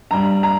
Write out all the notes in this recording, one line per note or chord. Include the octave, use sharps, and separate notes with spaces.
G2 G3 A#5
A#5